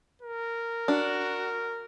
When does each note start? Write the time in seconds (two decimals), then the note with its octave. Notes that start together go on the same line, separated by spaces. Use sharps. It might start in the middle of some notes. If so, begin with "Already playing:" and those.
0.21 A#4
0.88 D4 F#4